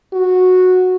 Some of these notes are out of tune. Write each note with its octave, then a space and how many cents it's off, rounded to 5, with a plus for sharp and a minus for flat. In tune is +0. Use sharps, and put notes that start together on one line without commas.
F#4 -10